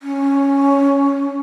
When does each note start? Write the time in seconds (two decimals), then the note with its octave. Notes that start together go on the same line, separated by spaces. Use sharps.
0.01 C#4